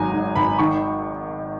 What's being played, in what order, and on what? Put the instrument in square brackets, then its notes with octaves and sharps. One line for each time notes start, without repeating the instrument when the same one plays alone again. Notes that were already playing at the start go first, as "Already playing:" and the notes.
Already playing: [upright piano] G#1 F#3 G#5 A#5
G#2
G#1 B5
D#3 C#6